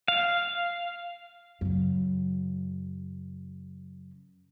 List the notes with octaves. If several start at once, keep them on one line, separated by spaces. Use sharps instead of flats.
F5
F#2 C#3